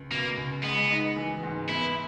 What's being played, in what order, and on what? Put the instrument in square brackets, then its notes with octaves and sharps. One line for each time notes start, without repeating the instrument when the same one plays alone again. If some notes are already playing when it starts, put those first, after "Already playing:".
Already playing: [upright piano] C#2
[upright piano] B2 [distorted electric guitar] A#3
[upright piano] C#2
[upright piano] G#3 [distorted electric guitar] B3
[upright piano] D#4
E3
G#2
[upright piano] B3 [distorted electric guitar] E4